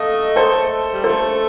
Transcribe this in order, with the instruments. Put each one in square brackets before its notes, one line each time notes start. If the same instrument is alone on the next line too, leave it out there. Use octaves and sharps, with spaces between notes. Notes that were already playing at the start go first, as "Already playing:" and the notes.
Already playing: [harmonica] A3 [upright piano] D#5 F5
[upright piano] A4 C5
[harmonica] G3
[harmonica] F3 A3 [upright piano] A4 C5